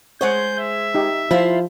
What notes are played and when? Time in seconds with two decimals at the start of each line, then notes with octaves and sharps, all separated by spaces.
0.21 G#3 G#4 C5 C#5 F#5 G6
0.59 E5
0.94 D#4 G4
1.31 F3 E4 F4 C5 B5